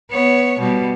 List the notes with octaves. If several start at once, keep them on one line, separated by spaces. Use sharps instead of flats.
B3 C#5
B2 G3